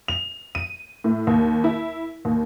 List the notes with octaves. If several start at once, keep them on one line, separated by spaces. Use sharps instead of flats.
F7
D#7
A2
D#2
E4
D#2